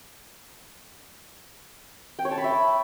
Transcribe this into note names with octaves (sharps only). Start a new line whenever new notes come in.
G5
C#5
A5
B5
E5